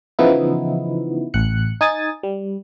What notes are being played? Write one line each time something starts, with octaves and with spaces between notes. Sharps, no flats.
C#3 E3 F3 B3 D#4 E4
A1 F#6 C#7
D#4 G#5 D#6 A6
G3